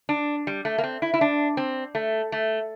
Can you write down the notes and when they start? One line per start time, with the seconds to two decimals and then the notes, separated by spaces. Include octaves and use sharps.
0.09 D4
0.47 G3
0.65 A3
0.78 A#3
0.84 C4
1.02 E4
1.14 E4
1.21 D4
1.57 C4
1.95 A3
2.32 A3